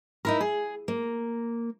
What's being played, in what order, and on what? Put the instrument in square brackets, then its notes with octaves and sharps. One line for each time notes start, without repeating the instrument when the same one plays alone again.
[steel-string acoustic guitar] D#4 E4 A#4
G#4
A#3